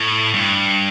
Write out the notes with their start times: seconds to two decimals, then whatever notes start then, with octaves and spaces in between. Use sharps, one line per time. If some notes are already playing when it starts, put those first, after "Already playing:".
Already playing: A2
0.34 G2